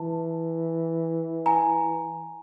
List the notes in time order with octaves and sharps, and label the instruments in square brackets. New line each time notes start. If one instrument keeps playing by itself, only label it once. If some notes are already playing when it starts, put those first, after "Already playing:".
Already playing: [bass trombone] E3 [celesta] A5
[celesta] G#5 A#5